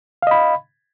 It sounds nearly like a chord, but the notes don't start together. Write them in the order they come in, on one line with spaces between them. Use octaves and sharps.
F5 D#5 B5